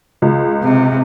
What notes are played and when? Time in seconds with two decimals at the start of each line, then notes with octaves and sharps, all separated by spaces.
0.22 C#2
0.63 C3